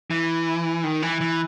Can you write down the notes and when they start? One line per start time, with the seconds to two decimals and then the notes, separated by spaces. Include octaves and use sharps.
0.11 E3
0.84 D#3
1.02 E3
1.21 E3